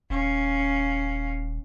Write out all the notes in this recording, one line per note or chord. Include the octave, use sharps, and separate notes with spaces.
D#1 C#4 F5